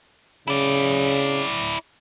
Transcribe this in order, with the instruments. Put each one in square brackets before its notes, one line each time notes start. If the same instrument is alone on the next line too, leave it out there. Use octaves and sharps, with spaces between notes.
[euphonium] C#3 [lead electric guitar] E4 D5